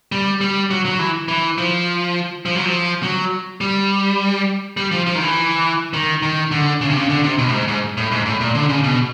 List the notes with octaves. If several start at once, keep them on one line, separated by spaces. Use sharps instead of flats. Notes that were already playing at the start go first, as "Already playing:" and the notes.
G3
G3
F#3
F#3
E3
E3
F3
F3
F#3
F3
F#3
G3
G3
F3
F3
D#3
E3
D#3
D#3
D3
C#3
C3
C#3
D3
C3
B2
A2
G#2
G#2
A2
G#2
A2
A#2
D3
C#3
B2